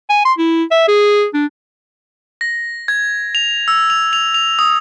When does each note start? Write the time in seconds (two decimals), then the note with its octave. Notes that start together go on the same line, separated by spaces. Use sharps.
0.10 G#5
0.25 C6
0.38 E4
0.71 E5
0.88 G#4
1.34 D4
2.41 A#6
2.88 G#6
3.35 F7
3.68 E6
3.90 F7
4.13 F7
4.34 F7
4.59 D#6